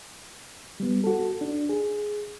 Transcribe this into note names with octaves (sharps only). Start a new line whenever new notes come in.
G3 B3
F#4 A4
D4
G#4